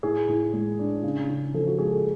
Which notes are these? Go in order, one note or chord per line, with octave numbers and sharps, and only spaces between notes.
A2 G#4
A2
G#3
D4
C#3
C#3
F3 A4
F#4
G#3 G#4
A4